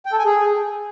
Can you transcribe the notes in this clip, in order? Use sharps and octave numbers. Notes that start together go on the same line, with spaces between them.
G5
A4
G#5
G#4